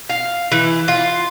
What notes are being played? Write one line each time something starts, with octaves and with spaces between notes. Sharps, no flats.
F5
E3
F4